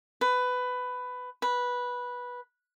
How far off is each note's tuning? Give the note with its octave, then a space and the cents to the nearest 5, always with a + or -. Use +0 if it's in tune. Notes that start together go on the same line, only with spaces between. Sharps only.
B4 +15
B4 -10